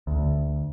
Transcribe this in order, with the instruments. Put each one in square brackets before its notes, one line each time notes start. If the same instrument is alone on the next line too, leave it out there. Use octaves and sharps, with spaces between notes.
[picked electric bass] D2